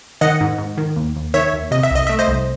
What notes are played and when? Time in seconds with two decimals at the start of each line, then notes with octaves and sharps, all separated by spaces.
0.21 D#3 D#5 F#5
0.41 G#2
0.58 G#2
0.78 D#3
0.96 D#2
1.16 D#2
1.34 D#3 C#5 E5
1.53 D#2
1.71 C3 D#5
1.83 E5
1.91 C2 D#5
2.07 A3 E5
2.19 C5 D#5
2.28 C2